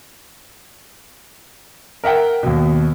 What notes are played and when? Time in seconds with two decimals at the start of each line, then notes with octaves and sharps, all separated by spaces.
2.04 A#4 E5 F#5 G5
2.43 D#2 B2